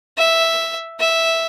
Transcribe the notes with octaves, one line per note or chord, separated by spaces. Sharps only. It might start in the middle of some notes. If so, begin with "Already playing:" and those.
E5
E5